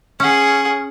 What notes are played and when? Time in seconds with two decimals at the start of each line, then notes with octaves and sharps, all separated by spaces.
0.20 C#4 G#4 F#5